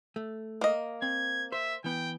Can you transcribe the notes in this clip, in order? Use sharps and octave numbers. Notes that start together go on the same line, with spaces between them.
A3
A#3 D#5
C4 G#6
C5 E5
E3 B3 G5